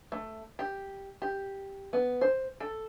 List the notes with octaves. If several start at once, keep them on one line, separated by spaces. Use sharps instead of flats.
A3
G4
G4
B3
C5
A4